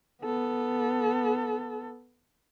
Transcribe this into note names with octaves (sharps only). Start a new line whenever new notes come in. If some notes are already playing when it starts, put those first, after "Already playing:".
B3 A4